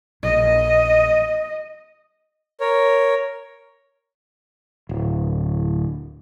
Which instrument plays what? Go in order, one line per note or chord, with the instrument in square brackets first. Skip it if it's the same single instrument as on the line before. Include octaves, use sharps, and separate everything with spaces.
[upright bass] A#1 [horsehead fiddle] D#5
[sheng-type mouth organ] A#4 C#5
[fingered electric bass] D1